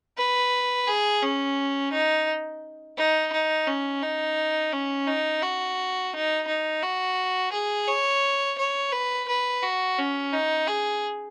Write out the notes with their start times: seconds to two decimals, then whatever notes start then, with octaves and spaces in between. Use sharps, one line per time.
0.18 B4
0.87 G#4
1.22 C#4
1.92 D#4
2.98 D#4
3.32 D#4
3.67 C#4
4.02 D#4
4.72 C#4
5.07 D#4
5.43 F#4
6.13 D#4
6.48 D#4
6.83 F#4
7.52 G#4
7.88 C#5
8.58 C#5
8.93 B4
9.28 B4
9.63 F#4
9.98 C#4
10.33 D#4
10.67 G#4